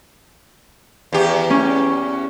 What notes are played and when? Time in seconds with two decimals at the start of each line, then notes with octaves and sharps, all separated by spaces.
1.13 E2 G4
1.50 C#4